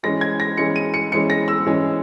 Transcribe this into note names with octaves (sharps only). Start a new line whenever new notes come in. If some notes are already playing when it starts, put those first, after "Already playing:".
E3 G#3 C#4 A#6
G#6
A#6
E3 G#3 C#4 C#7
D#7
C#7
E3 G#3 C#4 C#7
A#6
E6
E3 G#3 C#4